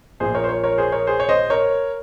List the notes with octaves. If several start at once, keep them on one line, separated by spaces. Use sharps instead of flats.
A#1 A#2 G#4 C5
A#4 C#5
C5
A#4 C#5
A#4 C#5
G#4 C5
A#4 C#5
G#4 C5
C#5
C5 D#5
A#4 C#5